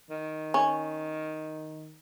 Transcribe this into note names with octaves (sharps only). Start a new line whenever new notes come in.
D#3
C#4